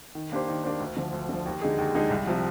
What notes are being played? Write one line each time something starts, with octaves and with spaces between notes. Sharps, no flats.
D#3
A#3 D4 G4 C5
D#3
A#3 D4 G4 C5
D2
D3 F3
D2
D3 F3
D#2
D3 G#3 D#4 G#4
D#2
D3 G#3 D#4 G#4
C2
C3 F3